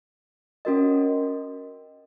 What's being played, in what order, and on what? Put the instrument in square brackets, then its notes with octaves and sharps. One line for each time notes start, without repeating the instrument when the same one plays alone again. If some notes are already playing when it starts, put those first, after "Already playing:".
[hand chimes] C#4 F#4 A#4 D#5